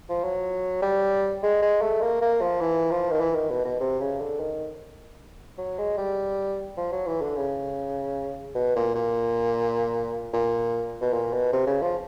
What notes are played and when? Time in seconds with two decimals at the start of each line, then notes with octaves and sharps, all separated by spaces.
0.09 F3
0.24 F#3
0.82 G3
1.43 G#3
1.62 G#3
1.82 A3
2.01 A#3
2.22 A#3
2.41 F3
2.61 E3
2.91 F3
3.11 D#3
3.20 E3
3.35 D#3
3.50 B2
3.65 B2
3.80 C3
4.00 C#3
4.19 D3
4.40 D#3
5.58 F#3
5.78 G#3
5.97 G3
6.77 F3
6.92 F#3
7.07 E3
7.21 D3
7.36 C#3
8.55 B2
8.76 A#2
8.95 A#2
10.33 A#2
11.01 B2
11.13 A#2
11.33 B2
11.53 C3
11.67 C#3
11.82 F3